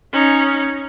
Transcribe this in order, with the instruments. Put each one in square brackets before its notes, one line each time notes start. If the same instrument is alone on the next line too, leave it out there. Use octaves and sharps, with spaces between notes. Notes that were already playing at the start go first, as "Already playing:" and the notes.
[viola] C#4 D#4